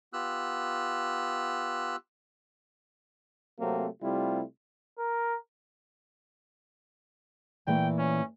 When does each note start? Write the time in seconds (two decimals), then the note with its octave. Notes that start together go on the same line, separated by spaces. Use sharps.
0.13 B3 F4 G4 E6 F#6
3.60 C3 F#3 A3 A#3 C4
4.03 C3 G3 A3 C4 E4 F4
4.99 A#4
7.67 A#2 E3 A3 G5
7.98 C#4